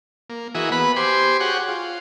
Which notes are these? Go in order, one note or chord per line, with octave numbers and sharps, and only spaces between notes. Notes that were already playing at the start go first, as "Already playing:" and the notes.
A#3
E3 A#3 F#4 G#4 D#5 E5
B3 B4 B5
G4 C5 G#5 C6 D6
F#4 G#4 C#5 F#5 G5
F4